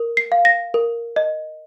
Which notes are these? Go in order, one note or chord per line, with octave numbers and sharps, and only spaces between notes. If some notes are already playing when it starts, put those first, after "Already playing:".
Already playing: A#4
C7
F5
A#6
A#4
D#5